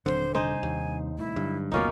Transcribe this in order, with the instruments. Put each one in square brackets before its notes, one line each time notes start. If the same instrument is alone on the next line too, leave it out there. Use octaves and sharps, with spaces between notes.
[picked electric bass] D#1 B1 D3 [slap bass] F#3 C4 [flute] C5
[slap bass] C3 G3 D4 [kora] D#4 C5 [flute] G#5
[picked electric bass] D#2
[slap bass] D#1 C2 A3 [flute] E4
[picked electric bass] G2 [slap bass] D3 F#3
[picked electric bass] F#1 D2 B2 [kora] A#3 C#4 D#4 [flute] F4